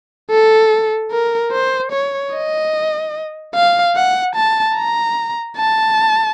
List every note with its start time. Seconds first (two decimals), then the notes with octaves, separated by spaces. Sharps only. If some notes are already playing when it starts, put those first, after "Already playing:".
0.30 A4
1.11 A#4
1.52 C5
1.92 C#5
2.33 D#5
3.55 F5
3.95 F#5
4.35 A5
4.77 A#5
5.57 A5